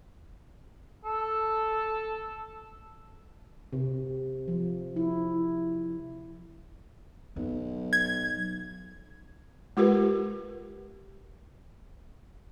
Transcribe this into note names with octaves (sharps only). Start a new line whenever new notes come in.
A4
C3
F3
E4
B1 F#3
G#6
G#3 F4 G4 A#4 B4